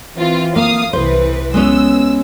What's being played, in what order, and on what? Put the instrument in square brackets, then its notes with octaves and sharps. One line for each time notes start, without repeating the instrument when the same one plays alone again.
[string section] E3 C4 F4
[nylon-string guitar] A#3 [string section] F5 D#6
[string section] C2 E3 B4 [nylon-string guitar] C5
[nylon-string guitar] G#3 B3 C#4 [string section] E6